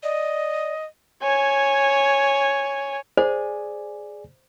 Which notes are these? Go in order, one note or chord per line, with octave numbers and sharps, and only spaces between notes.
D5 D#5
C#5 G#5
G#4 C5 D5 G#5